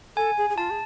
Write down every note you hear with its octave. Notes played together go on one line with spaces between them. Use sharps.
A4 G#5
G#4
G#4
F4 A5
G#4